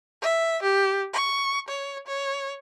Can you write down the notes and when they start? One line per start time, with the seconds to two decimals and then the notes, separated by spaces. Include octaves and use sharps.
0.22 E5
0.62 G4
1.13 C#6
1.68 C#5
2.07 C#5